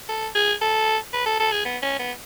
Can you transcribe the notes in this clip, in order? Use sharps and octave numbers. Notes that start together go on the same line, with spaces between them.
A4
G#4
A4
B4
A4
A4
G#4
B3
C#4
B3